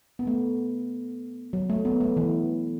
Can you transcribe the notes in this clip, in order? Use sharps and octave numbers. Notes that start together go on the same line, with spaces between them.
B3
A3
F#3
A3
B3
A3
E3